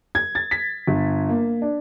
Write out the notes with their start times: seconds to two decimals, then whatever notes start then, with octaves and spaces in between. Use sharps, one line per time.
0.15 G#6
0.35 A6
0.51 B6
0.87 G1
1.29 A#3
1.62 D4